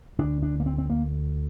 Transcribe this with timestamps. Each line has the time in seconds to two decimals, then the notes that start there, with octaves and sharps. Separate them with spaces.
0.19 D2 D3 D4
0.42 D4
0.60 A#3
0.66 C4
0.78 C4
0.90 A#3